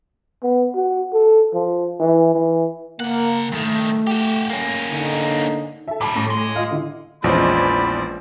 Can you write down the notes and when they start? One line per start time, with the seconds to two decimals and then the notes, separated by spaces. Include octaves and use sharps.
0.43 B3
0.75 F#4
1.13 A4
1.53 F3
2.00 E3
2.34 E3
3.00 C#3 A#3 F#5
3.52 G2 D#3 A3
4.07 F#4 G4
4.50 A#3 C#4
4.90 D3 D#4
5.88 A4 E5
6.01 A#2 G3 A5 D6
6.16 A2 C#6 A#6
6.30 G#3
6.56 F4 D#5 F5
6.71 D3 E4
7.24 A#1 E2 F3 G#3 C#4 C5 D5 B5